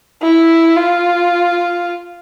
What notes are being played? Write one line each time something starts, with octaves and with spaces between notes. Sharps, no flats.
E4
F4